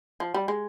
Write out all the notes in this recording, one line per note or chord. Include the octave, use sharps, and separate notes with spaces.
F3
G3
G#3